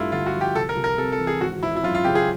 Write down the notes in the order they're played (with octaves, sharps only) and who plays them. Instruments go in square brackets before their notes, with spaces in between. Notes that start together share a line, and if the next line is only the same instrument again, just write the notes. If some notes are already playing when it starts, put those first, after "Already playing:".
Already playing: [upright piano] G2 A3 [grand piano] E4 F4
[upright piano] D3 [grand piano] F4
[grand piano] F#4
[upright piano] F3
[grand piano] G4
[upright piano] C2 [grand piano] A4
[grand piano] A#4
[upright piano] C2
[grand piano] A#4
[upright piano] C3 [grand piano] A4
[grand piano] A4
[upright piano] E3
[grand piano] G#4
[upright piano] G#1 [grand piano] F#4
[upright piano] G#1 [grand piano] E4
[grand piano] E4
[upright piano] F#2 [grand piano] F4
[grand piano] F4
[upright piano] C#3 [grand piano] G4
[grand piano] G#4